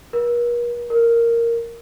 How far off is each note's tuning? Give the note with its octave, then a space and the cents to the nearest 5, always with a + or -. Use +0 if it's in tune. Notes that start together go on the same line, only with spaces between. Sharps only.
A#4 +45
A#4 -5